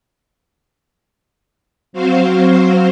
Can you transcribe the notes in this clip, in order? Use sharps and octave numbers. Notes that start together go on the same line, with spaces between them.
F#3 C4 F#4 C5 F5